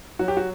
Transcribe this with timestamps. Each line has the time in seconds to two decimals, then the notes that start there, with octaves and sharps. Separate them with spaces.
0.19 F#3 F#4
0.28 G4
0.37 F#4